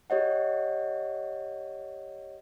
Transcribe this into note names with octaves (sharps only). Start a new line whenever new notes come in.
G4 C#5 D#5 F#5